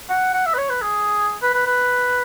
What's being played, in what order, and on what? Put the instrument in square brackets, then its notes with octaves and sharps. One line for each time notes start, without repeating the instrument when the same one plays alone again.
[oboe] F#5
F#5
E5
B4
C#5
B4
G#4
B4
B4
B4